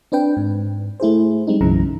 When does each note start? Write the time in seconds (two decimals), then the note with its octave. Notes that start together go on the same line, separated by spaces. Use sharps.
0.12 C4 D4 B4 G5
0.37 G#2
1.00 A3 E4 G#4 C5
1.47 G3 G#3 C4 D#4
1.61 B1 F#2 C#3 E3 A#5